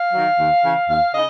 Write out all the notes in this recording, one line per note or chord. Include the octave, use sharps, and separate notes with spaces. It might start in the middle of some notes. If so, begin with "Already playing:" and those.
Already playing: F5
D#3 F#3
D#2
C#3 E3
D#2 F5
C#3 D#5